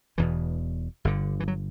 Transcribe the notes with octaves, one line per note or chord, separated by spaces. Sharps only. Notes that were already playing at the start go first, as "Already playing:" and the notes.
E1 E2 B2 E3
G1 G2 D3
E3
F#3